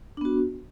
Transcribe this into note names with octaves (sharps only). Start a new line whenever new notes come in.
B3 D4 F#4